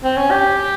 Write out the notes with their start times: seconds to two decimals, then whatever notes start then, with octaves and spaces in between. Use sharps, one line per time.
0.04 C4
0.17 C#4
0.31 G4